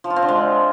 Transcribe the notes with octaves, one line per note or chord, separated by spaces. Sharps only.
F3
F4
C4
D3
G#3